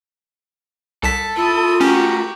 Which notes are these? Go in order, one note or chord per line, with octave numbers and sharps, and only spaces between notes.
C2 A4 A5 B6
E4 F4 D#6
A3 C#4 F#4 G4 A#4